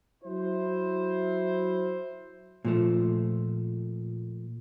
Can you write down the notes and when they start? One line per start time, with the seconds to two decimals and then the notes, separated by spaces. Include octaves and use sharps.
0.24 F#3 E4 C5
2.65 A#2 F3 A3